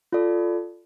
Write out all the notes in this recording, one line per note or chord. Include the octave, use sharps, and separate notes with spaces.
F4 A4 D5